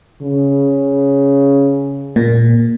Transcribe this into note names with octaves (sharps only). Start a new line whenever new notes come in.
C#3
A#2